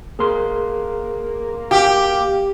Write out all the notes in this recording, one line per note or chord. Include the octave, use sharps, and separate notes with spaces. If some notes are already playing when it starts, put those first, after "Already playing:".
A#3 G#4 A#4 C6
G4 F5 D6